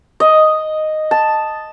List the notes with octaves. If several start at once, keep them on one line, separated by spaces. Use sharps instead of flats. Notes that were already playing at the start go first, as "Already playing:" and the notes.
D#5
A5